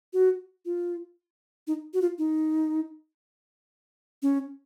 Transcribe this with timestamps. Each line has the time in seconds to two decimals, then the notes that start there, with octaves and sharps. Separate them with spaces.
0.13 F#4
0.65 F4
1.67 D#4
1.94 F#4
2.02 F4
2.18 D#4
4.22 C#4